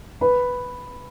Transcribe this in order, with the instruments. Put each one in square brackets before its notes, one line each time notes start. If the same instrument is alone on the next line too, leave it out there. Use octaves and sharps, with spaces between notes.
[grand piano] B4 B5